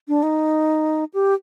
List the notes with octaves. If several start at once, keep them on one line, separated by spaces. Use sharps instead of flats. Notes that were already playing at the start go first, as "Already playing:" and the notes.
D4
D#4
G4